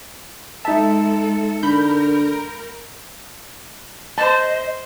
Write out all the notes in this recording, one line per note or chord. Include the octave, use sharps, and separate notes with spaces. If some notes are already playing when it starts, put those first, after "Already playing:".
G#3 D#4 A4 E5 A5
D3 A#4 B5 G6
C5 D#5 A5